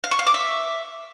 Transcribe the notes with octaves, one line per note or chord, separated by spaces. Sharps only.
F5
C#6
F5
D6
E5